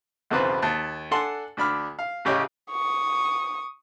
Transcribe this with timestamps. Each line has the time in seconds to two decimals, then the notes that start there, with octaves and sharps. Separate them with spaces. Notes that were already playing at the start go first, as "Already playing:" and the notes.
0.31 B1 E2 C#3 C4 B4 C5
0.62 D#2 A5
1.11 D4 A4 F#5 G#5 A5 C6
1.57 D2 D4 B5 F6
1.99 F5
2.25 A1 C#3 G4 C#5 D#5
2.71 C#6 D#6